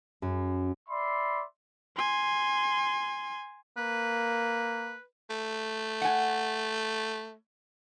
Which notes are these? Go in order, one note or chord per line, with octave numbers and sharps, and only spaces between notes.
F#2
D5 E5 B5 C6
G#5 C6
A#3 B4
A3
F#5 G#5